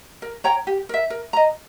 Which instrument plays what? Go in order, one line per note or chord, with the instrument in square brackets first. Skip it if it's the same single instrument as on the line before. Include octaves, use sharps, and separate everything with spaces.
[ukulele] A#4
C#5 G5 A#5
G4
A#4 E5
A#4
D#5 A#5